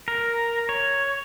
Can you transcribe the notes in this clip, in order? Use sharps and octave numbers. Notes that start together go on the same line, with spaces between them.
A#4
C#5